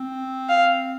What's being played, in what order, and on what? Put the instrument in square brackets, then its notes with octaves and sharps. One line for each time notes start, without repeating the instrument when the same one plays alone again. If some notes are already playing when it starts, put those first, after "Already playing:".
Already playing: [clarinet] C4
[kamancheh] F5